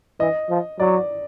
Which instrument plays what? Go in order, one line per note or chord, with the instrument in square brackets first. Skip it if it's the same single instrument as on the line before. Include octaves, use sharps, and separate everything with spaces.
[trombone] E3 [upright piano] D#5
[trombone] F3
[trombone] F#3 [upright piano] D5